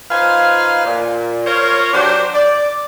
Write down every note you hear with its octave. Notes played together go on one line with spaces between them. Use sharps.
D#4 F4 B4 C5 F5 G#5
A#2
F4 A#4 C5 C#5
F#3 D4 G4 C5
D5